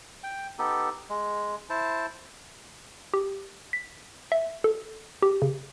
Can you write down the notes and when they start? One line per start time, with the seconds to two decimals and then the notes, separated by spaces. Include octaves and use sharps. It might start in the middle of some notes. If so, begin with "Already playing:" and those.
0.24 G5
0.59 B3 D#4 G4 A4
1.09 G#3
1.70 E4 C5 A5
3.14 G4
3.73 B6
4.32 E5
4.64 A4
5.22 G4
5.42 C#3